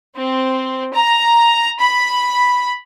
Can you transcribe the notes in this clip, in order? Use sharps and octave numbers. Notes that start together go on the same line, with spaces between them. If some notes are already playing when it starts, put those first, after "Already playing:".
C4
A#5
B5